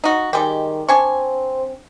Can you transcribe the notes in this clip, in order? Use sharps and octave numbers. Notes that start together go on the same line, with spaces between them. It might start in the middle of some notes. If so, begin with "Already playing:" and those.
D#4 F#4
D#3 G3 G#3 G4
C4 D4 G#5 C#6